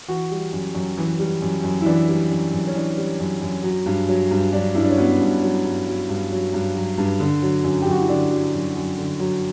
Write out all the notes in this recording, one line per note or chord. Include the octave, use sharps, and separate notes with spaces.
E3 F#4
G3
F#2
F#2
E3
G3
F#2
F#2
E4
E3 D4
G3
F#2
F#2
C#4
E3 D4
G3
F#2
F#2
F#3
G2
F#3
G2
F#3 D4
G2 E4
D4
C#4
F#3 B3
G2
F#3
G2
F#3
G2
F#3
G2
F#3
G2
D3
F#3
F#2
G4
F#2 F#4
E4
D3 D4
F#3
F#2
F#2
D3
F#3